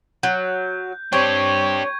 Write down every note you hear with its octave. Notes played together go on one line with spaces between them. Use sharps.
F#3 G6
C4 D4 G4 C#5 C#6 G#6